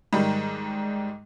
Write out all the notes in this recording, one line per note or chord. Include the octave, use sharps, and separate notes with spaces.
G#2 D#3 G3